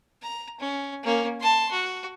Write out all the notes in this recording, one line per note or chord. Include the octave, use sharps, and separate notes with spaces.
A#5
C#4
A#3 C#4
A5 C6
F#4